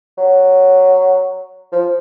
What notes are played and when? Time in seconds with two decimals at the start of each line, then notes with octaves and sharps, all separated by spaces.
0.18 F#3
1.72 F3